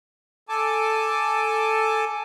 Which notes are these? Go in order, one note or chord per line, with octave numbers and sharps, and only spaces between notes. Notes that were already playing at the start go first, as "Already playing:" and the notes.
A4 G#5 A5 D6